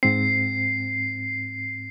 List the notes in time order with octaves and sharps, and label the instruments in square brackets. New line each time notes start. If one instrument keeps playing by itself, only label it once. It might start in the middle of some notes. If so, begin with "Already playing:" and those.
[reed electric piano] G#2 C4 [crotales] C7